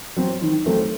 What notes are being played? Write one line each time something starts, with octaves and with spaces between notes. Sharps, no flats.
F#3 C4
D#3
F#3 A3 C4